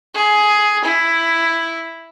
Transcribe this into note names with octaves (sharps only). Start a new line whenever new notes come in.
G#4
E4